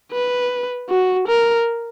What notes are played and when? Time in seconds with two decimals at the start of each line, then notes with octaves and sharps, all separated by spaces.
0.12 B4
0.89 F#4
1.28 A#4